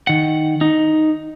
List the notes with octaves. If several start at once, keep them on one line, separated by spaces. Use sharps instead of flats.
D#3 F#5
D#4